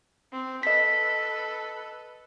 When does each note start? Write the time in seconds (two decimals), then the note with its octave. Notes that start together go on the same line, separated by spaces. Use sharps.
0.33 C4
0.63 A4 B4 D#5 B6